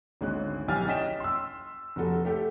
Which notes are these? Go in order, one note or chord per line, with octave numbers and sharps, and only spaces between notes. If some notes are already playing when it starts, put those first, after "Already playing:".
G#1 D2 G#3 C#4 F#6
B1 E3 G4 G#5 F6 A6
C#4 D#5 G5 B6 E7
C6 E6
F1 F#4 A4
A3 G4 A4